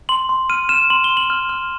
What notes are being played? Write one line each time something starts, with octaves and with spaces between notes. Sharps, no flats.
C6 F#7
C6
F6 D#7
F6 E7
C6 F#7
G7
C6
F#7
F6
F6